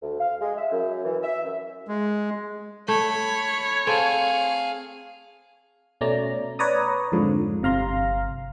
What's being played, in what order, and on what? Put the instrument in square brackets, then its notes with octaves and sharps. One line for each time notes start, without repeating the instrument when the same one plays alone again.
[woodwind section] D2
F5
G#3
E5
F#2
E3
E5
F#2
[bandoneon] G#3
[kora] A3 [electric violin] C#5 [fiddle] B5
[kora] C4 A4 [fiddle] G#4 F5
[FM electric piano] B2 A3 C#4 D5 A#5
B4 C#5 D5 A#5 D#6
F2 G#2 D3 F3
G1 C3 F5 A#5 C6